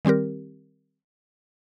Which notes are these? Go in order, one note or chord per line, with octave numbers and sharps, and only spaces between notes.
D#3 G3 C4 G4 A#4